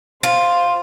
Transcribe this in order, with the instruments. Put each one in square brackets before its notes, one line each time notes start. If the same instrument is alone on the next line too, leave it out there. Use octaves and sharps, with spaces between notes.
[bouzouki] F4 [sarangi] C5